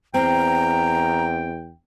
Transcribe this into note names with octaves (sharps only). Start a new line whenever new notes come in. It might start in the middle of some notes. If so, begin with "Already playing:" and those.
E2 C4 G5 A#5